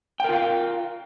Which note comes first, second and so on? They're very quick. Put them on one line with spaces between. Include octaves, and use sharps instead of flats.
G5 A#4 F4 F5